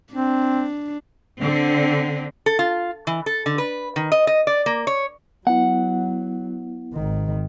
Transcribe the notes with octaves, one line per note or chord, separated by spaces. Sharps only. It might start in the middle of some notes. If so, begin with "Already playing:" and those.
C4 D4
D3 C4
A4
F4
E3
A4
D3
B4
D#3
D#5
D#5
D5
A#3
C#5
F#3 B3 E4 F#5
G#1 D#3